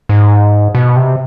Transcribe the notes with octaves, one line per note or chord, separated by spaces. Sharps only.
G#2
B2
C3